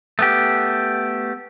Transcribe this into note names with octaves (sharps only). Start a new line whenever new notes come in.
A3 B3 G4